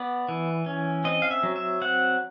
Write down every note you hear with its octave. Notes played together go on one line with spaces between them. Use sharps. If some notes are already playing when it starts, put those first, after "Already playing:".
Already playing: B3 D5
E3
C#4
C4 D#5
F5
E5
F#3
E5
C4 F#5